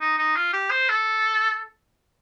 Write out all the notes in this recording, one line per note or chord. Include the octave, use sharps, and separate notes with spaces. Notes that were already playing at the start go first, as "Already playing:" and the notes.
D#4
D#4
F4
G4
C5
A4